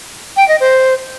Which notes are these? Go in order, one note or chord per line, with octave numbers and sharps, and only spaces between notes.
G5
D#5
C5